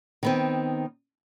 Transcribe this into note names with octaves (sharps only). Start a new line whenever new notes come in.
D#3 B3 C4